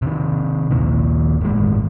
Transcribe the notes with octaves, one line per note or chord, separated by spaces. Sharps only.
C3 D#3
A#1 D#2 A#2 D#3
G1 A2 G#3